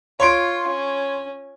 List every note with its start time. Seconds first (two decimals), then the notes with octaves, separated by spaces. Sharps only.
0.20 F4 C#5 C6 D7
0.67 C#4